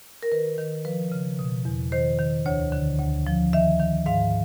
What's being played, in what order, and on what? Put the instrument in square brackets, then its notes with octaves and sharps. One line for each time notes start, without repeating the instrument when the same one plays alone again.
[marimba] A#4
D#3 B4
D#3
F3 B4
C#3
B2
E2
D#3 C5
D#3
D2 C#5
D3
D2
F3
D#3 E5
D#3
G#2 F5